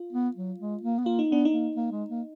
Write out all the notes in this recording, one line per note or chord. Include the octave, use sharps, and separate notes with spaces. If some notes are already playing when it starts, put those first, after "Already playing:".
Already playing: F4
B3
F#3
G#3
A#3
B3
A#3 F4
D#4
B3 D4
D#4
A#3
A#3
G#3
A#3